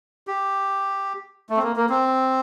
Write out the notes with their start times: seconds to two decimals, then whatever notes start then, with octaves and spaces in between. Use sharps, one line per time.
0.27 G4
1.50 A3
1.57 C4
1.63 A#3
1.76 A#3
1.90 C4